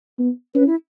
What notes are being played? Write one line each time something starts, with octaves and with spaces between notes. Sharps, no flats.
B3
C#4 B4
E4